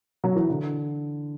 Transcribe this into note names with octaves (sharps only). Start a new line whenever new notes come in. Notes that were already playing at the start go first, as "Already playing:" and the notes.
F#3
E3
D3